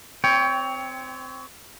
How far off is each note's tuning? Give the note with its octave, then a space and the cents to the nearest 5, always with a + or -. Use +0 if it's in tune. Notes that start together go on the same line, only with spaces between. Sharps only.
C4 -10 C#5 +25 G5 +10